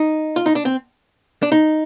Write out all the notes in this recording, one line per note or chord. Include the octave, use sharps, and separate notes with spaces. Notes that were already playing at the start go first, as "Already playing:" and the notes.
Already playing: D#4
F4
D#4
D4
C4
D4
D#4